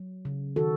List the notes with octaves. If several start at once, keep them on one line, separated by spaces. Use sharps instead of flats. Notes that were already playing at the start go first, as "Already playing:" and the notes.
Already playing: F#3
C#3
D#3 F#4 A4